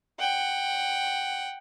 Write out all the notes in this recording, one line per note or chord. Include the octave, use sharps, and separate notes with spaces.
F#5 G5